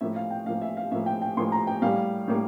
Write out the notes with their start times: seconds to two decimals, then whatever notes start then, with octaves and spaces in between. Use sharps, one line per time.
0.01 A2 F3 A#3 E5
0.16 F5
0.31 G5
0.46 A2 F3 A#3 F5
0.61 E5
0.77 F5
0.91 A2 F3 A#3 E5
1.06 G5
1.22 G5
1.37 A2 F3 A#3 C6
1.52 A#5
1.67 G5
1.82 A2 G3 A#3 F5
2.28 A2 G3 A#3